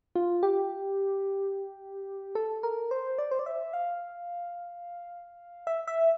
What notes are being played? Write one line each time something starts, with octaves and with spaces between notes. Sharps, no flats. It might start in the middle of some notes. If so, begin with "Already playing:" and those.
F4
G4
A4
A#4
C5
D5
C5
D5
E5
F5
E5
E5